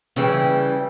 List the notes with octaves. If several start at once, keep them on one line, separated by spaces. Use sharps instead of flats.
C#3 E3 G3